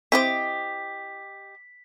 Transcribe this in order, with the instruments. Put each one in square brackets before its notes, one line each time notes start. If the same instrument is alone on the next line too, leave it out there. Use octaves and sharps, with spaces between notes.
[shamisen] C4 E4 C5 [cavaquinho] G4 D#5 D6 [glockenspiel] B6